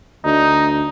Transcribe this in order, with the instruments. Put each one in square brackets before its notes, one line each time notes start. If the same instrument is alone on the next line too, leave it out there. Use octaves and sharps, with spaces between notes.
[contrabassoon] D2 [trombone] D#4